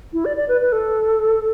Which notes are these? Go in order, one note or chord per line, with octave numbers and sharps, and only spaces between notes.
E4
D5
D5
B4
B4
A4